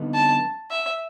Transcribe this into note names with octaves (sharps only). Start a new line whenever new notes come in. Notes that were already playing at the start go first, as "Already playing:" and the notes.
Already playing: F2 D3 G3 B3 D#4
A5
E5